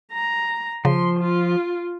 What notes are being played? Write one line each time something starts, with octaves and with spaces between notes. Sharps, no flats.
A#5
C#3 F3 C6
F4